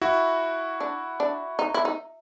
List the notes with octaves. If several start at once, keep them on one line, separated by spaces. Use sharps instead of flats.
E4 F#4
D4
D4
D#4
E4
D#4